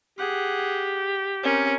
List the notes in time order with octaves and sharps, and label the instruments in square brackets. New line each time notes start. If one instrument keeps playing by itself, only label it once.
[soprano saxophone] G4 [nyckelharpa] G#4 F#5
[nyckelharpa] C4 A#4 [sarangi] C#4